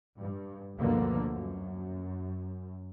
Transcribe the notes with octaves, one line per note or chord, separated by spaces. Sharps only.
G2
D2 G2 B2 D3 F3 A#3
F#2